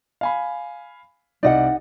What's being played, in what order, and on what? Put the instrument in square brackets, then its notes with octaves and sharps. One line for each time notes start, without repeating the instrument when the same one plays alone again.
[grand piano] F5 G#5 B5
[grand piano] C2 D5 [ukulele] D#4 D#5 F#5